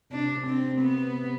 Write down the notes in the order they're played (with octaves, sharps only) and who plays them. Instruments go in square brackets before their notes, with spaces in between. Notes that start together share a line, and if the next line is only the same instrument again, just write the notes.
[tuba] C3 [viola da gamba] D4
[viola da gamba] C4
B3